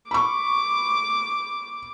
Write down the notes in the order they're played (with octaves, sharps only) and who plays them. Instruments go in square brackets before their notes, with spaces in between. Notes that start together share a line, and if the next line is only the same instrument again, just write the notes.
[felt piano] B5 C#6 [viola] D6